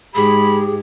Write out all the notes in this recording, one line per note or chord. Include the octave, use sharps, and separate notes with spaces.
G#2 G#3 G4 G#4 B5